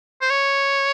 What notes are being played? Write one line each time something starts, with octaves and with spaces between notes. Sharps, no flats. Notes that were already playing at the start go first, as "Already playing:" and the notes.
C5
C#5